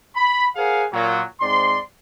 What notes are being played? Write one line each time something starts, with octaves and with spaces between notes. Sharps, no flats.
B5
G#4 A#4 C5 F5 F#5 G#5
A#2 F#3
G#2 C4 D5 C6